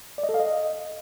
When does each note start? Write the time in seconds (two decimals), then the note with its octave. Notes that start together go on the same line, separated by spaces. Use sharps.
0.18 D5
0.24 D#5
0.29 A4
0.34 F5
0.40 D#5